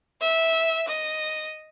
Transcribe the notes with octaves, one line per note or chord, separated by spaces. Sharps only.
E5
D#5